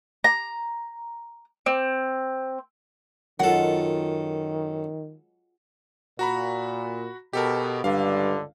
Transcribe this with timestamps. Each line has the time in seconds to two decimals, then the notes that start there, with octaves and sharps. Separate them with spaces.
0.24 A#5
1.66 C4
3.40 F#2 D#3 F#3 G#3 F4 A4 F#5
6.19 A#2 F#4 A#5 B5
7.33 B2 G4 A4 A#4
7.84 C#2 G2 D3 F5